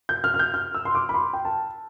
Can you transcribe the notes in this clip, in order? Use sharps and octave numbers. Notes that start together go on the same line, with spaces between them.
G6
F6
F6
G6
F6
E6
C6
D6
B5
C6
G5
A5